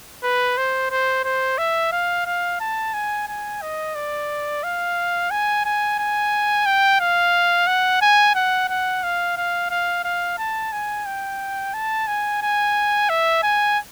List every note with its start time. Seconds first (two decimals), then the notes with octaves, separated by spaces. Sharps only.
0.23 B4
0.57 C5
0.91 C5
1.24 C5
1.58 E5
1.92 F5
2.26 F5
2.60 A5
2.94 G#5
3.28 G#5
3.62 D#5
3.95 D5
4.63 F5
5.31 G#5
5.65 G#5
5.99 G#5
6.66 G5
7.00 F5
7.67 F#5
8.02 G#5
8.35 F#5
8.69 F#5
9.03 F5
9.37 F5
9.70 F5
10.04 F5
10.38 A5
10.72 G#5
11.06 G5
11.74 A5
12.07 G#5
12.42 G#5
13.09 E5
13.43 G#5